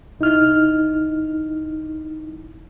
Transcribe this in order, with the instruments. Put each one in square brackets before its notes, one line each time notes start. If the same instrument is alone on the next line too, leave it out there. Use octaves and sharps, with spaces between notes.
[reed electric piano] C2 D#4 E4 F6